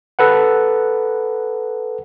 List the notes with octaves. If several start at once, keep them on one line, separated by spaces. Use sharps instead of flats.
A4 B4 F#5